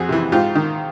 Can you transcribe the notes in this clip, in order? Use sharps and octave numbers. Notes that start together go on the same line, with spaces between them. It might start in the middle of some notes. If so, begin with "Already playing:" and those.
Already playing: F2 F#4 G#4
C3 E3
G#2 F4 G4
D#3